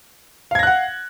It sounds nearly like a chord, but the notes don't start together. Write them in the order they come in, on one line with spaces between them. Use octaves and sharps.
F5 G#6 A#6 F#6 F#5